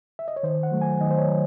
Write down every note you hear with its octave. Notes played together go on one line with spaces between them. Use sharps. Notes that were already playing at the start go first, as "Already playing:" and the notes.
E5
D#5
C#5
D#3 C5
F#5
F#3 A3
G#5
D#3 D#5
C5
C#5
F#3